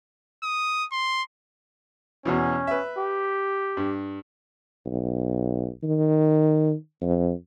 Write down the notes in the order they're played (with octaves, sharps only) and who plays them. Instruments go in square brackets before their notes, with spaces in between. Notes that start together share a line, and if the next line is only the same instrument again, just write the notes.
[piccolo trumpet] D#6
C6
[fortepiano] E2 B2 E3 [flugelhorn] C#4
[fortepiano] B4 E5
[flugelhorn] G4
[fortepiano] G2
[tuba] B1
D#3
F2